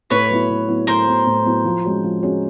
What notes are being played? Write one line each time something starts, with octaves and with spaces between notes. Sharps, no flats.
A2 B4 C#5
F#3 B3 E4
A2
F#3 B3 E4
A2 A#4 C5
F#3 B3 E4
A2
F#3 B3 E4
F3
G#3 C#4 F#4
F3
G#3 C#4 F#4